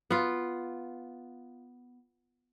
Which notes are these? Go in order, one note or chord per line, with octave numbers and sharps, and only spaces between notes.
B3 F4